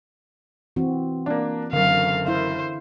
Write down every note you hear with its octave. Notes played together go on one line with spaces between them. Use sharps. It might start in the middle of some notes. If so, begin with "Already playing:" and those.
E3 C4 F#4
A#3 D4
F#1 F#2 D3 F5
E4 C5 E5 F5